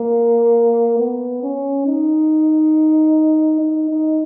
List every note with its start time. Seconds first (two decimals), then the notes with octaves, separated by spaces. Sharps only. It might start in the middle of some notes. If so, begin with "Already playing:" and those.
Already playing: A#3
0.99 B3
1.43 C#4
1.87 D#4
3.60 D#4
3.90 D#4